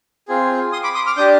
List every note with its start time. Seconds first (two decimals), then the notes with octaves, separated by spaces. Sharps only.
0.28 C4 F4 G#4
0.72 C6 D#6
0.83 B5 D6
0.95 C6 D#6
1.06 D6 F6
1.17 D4 G4 D#6 G6